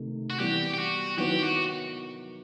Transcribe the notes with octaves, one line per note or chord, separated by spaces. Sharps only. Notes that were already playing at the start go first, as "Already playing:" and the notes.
Already playing: C3 D#3 A3
F#4
E3 G3 B3 G4
G4
F#4
D#3 F#3 B3 E4 G4 B4
F#4